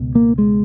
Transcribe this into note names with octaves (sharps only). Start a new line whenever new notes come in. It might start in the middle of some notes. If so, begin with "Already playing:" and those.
Already playing: C#2 B2
A#3
G#3